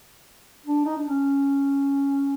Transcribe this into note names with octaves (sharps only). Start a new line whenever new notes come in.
D4
D#4
D4
C#4